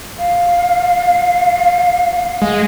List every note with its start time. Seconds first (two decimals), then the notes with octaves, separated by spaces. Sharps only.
0.18 F5
2.42 G#3